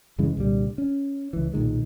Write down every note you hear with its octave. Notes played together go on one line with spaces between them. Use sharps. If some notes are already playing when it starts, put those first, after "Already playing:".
F#2 C#3 E3 G#3
C2 A#2 D3 G3
C#4
C#2 E3
B1 A#2 D#3 G#3